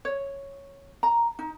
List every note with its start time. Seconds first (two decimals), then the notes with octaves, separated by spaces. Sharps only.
0.05 C#5
1.03 A#5
1.39 D#4